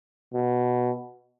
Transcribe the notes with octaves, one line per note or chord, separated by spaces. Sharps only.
B2